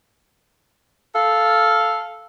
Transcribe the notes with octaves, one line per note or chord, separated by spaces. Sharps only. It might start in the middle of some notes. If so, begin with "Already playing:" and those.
A4 F5